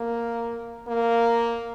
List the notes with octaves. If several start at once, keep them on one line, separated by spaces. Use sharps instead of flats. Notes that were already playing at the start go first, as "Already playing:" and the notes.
Already playing: A#3
A#3